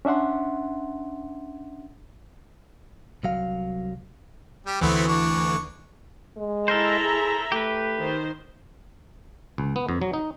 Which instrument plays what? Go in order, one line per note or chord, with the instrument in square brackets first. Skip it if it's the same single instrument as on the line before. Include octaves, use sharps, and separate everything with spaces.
[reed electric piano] C#4 D4 E5 F#5 C6
[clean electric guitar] C2 F#3 F5
[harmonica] G3 G4
[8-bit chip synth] D2 E3 [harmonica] A3 B3 C4
[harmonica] D4 C#6
[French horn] G#3
[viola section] E4 E5 A#5 [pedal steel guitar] A4 A#4 C5
[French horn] G#4
[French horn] A3 [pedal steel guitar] G4 B4
[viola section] D#3 C5
[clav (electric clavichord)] C#2
B3
F2
F#3
D#4